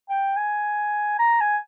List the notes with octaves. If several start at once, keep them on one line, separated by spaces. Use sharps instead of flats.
G5
G#5
A#5
G#5